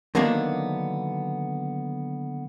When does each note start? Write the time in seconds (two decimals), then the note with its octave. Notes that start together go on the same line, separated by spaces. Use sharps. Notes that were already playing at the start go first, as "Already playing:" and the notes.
0.15 D3 D#3 F#3 A#3 B3 D4